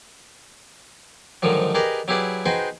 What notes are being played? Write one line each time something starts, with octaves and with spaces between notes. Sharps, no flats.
G#2 D3 D#3 F3 F#3
G4 G#4 A#4 B4 D5 D#5
F#3 E4 G4 G#4 B4 D5
D#4 F#4 G#4 B4 C5 G5